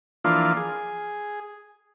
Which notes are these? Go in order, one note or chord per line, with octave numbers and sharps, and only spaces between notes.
E3 F3 A#3 D4 F4
G#4